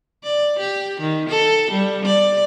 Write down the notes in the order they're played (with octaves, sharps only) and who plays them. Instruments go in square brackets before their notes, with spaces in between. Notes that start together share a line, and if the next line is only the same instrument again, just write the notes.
[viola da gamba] D5
G4
D#3
A4
G3
D5